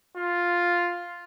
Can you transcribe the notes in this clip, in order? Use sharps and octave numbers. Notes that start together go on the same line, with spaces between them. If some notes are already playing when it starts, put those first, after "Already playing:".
F4